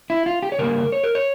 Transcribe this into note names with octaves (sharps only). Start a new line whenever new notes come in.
E4
F4
G4
C#5
C#3 G3 A#3 A#4
C#5
A#4
C#5